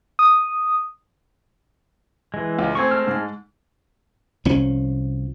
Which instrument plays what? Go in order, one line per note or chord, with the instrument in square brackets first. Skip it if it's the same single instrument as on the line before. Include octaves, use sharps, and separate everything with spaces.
[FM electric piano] D#6
[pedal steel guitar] E3 G#3
[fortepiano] C#2
[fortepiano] A3 C4 [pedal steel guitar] G#5 C#6
[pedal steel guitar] G#3 A5 F6
[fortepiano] G#2
[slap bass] C2 F3 C#4